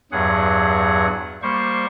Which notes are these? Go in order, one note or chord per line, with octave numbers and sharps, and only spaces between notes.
E2 G2 F#3 G#4 F#5
G3 A#3 C5 C#6